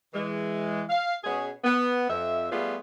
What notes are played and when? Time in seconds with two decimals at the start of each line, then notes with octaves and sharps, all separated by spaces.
0.14 E3 G#3
0.89 F5
1.23 B2 B3 C#4 G#4
1.64 B3
2.09 F2 E5
2.51 G3 A3 B3 F4 G#4 B4